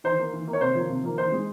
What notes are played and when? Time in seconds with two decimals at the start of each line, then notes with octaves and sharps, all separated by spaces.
0.04 E3 C5
0.19 A#3
0.33 E3
0.48 A#3
0.53 C#5
0.61 C3 C5
0.75 F3 A#3
0.90 C3
1.03 F3 A#3
1.18 E3 C5
1.32 G#3